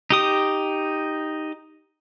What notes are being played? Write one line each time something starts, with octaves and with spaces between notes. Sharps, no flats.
D#4 G4 D#6